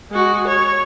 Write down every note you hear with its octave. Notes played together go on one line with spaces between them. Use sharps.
G#3 F#4
C#5